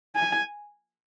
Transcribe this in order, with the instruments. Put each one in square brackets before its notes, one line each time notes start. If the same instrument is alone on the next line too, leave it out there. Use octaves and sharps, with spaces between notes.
[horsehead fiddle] G#5